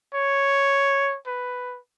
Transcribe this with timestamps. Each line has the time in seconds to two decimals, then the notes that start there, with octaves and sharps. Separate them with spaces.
0.14 C#5
1.27 B4